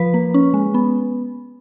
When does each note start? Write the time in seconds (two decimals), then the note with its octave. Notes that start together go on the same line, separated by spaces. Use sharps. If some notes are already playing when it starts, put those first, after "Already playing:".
Already playing: F3 B4
0.14 A#3
0.34 C#4
0.54 G#3
0.74 B3